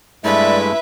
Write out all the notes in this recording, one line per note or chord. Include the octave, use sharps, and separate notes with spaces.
G2 G#3 A3 E4 B4 D5 E5